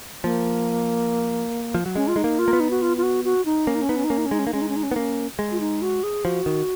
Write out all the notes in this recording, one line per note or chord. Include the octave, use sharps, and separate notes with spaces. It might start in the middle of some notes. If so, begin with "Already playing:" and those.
F3 A#3
F3
F#3
G#3 C#4
F4
G#3 D#4
A#3
F4
A#3
B3
D#4
F#4
F4
F4
F#4
F#4
D#4
A#3 C#4
D#4
C#4
B3 D#4
C#4
D#4
A#3 C#4
D#4
C#4
G#3 D#4
C#4
A#3 D#4
G#3 C#4
D#4
C#4
D#4
C#4
B3 D#4
A#3 C#4
G#3
F4
D#4
F#4
G#4
F3 F#4
D#3